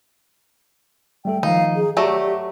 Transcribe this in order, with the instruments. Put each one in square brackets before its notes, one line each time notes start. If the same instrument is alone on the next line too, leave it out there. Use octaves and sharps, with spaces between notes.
[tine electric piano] G3 A3 A4 [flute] G5
[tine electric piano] D#3 F3 [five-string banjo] D#4 [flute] F5
[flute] G#4
[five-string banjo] F#3 A3 [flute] G4 [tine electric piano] D5 A#6